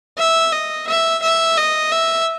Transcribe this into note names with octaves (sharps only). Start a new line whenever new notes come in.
E5
D#5
E5
E5
D#5
E5